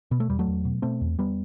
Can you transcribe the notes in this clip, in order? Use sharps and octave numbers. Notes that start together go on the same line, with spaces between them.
B2 B3
A3
E2 G3
F#3 A3
E2
B2
B2 A3 C4
E2
E2 G3 B3